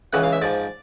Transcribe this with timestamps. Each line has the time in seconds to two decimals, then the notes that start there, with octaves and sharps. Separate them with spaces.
0.13 C#2 C#3 E3 F#5
0.23 F5
0.32 E5
0.42 G#2 F3 D5